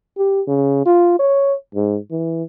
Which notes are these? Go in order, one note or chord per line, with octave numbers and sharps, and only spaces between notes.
G4
C#3
F4
C#5
G#2
E3